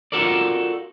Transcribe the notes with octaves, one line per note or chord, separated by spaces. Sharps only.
F4 F#4 A4 A#4 D5